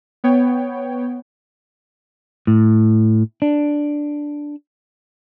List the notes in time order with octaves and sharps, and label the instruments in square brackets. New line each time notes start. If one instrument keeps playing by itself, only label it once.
[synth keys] B3 C#5 G5
[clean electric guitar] A2
D4